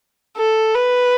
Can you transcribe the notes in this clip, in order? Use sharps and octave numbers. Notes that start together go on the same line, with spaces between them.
A4
B4